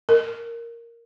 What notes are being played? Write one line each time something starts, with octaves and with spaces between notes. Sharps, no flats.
A#4